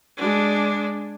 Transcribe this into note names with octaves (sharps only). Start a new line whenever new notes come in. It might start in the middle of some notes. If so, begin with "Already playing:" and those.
G#3 D4